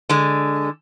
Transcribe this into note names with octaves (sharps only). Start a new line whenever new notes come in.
D3 G#3